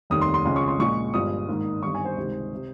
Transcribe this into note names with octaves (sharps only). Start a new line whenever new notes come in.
F1 D#2 D#3 G3 D#6
C6
C6
C#2 C#3 F3 G#3 C#4 C6
C#6
C6
A#1 A#2 G#3 C#6
G1 G2 F3 G#3 D#6
G#2 D#3 A#3
G1 G2 D#3 C#6
G#5
C5
C#2 C3 D#3 G3
C3